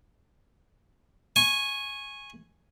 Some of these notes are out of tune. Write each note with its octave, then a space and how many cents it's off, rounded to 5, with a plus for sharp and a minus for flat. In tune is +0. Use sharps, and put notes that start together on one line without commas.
G#5 +0 C#6 -20